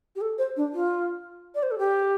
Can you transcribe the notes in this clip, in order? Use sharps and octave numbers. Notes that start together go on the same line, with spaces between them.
G4
A4
C5
D4
F4
D5
C5
A4
G4